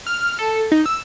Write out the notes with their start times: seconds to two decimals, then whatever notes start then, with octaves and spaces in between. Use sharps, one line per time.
0.06 F6
0.39 A4
0.72 D#4
0.86 E6